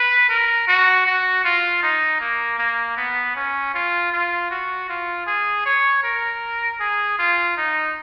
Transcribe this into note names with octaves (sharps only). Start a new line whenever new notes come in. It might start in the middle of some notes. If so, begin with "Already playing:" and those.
Already playing: B4
A#4
F#4
F#4
F4
D#4
A#3
A#3
B3
C#4
F4
F4
F#4
F4
G#4
C#5
A#4
G#4
F4
D#4